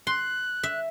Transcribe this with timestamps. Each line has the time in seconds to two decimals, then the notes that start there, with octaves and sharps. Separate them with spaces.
0.07 C6 F#6
0.63 E5